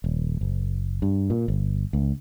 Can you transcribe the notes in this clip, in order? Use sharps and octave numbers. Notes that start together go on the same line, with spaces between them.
D#1
F#1
G2
A#2
G1
C#2